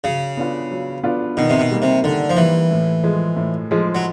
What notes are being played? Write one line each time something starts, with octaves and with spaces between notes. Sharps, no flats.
C#3 F#3
B3 D4 F4
F#3
B3 D4 F4
B2 D#3
C3
B2
G3 A#3
C3
D3 D#3
F3
E3 G3 A#3
A2
F3 G#3
A2
F3 G#3
F#3